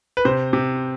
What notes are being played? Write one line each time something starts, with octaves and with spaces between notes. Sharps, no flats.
B4
C3 C5
C3